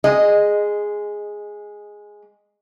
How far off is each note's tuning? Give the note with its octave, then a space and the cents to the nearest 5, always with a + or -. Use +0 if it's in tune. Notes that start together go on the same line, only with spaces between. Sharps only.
G#3 +0 D#5 -15